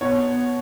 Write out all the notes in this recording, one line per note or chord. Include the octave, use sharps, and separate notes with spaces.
B2 B3 C#5